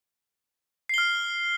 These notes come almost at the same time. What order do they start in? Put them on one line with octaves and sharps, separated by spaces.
C7 G7 F6